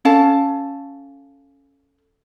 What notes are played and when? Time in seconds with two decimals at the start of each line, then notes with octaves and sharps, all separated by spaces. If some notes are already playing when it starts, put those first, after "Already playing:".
0.05 C#4 A4 F5 A5